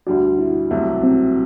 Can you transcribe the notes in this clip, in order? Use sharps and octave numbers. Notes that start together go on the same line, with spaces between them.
D2 D3 G3 D4 F#4
E4
C2 C3 F#3 A3
C4